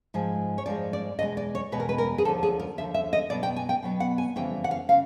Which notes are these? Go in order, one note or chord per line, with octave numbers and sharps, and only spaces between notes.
G#2 F3 G#3
C#5
G#2 F3 G#3 D5
D5
E2 B2 G#3 D#5
D5
C#5
E2 B2 G#3 B4
A#4
B4
A#4
G#4
D#2 D3 F3 A4
G#4
A#4
D#2 D3 F3 E5
E5
D#5
B2 F#3 B3 D5
G5
G#5
G5
B2 F#3 B3
F#5
G#5
F2 C#3 E3 G3 A#3 G5
F#5
F5
C#3 F5